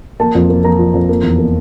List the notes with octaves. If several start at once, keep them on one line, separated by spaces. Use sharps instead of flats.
A#3 A5
F2
A#3
A#3 A#5
F3
F2
A#3
E2
A#3